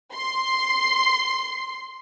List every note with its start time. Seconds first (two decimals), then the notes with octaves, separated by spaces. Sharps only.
0.13 C6 C7